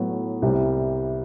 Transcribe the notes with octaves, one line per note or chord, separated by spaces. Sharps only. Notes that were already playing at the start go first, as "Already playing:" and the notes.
Already playing: A2 F#3 B3
C2 C3 G3